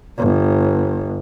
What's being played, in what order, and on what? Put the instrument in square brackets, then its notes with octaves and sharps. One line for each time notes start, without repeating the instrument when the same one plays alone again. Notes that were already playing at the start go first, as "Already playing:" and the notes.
[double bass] G1